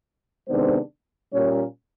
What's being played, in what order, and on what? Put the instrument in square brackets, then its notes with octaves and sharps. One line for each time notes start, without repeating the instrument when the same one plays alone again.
[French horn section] C3 D#3 G#3 B3 D4 C5
A#2 G3 A#3 C#4 C#5